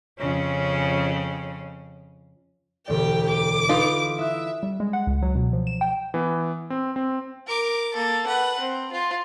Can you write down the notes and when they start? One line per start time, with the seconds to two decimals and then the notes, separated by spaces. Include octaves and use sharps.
0.19 F2 C#3 C#4
2.88 E1 D2 G4 D5 G5
3.30 D6
3.69 D#4 F4 B4 C6 D#6
4.18 E4 E5 D#6 F#6
4.63 G3
4.80 G#3
4.93 F#5
5.07 C#2
5.22 F#3
5.35 B2
5.53 F3
5.67 E7
5.81 G5
6.14 E3 B3
6.70 C4
6.96 C4
7.47 A#4 D6
7.94 A#3 A4
8.27 B4 F#5
8.60 C4
8.92 F4